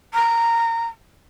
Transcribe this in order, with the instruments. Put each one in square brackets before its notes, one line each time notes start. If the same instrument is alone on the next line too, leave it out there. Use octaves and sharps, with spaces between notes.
[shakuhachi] A#5